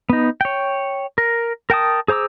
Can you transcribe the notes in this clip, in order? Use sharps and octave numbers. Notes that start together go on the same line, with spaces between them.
B3 D#4
C#5 G5
A#4
A#4 G5 A5 D#6
G#4 C5 A#5 D6 E6